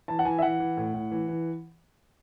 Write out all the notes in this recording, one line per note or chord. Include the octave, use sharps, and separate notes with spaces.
E3 A5
F#5
E3 G#5
E5
E3 F#5
E3
A2
A2
E3
E3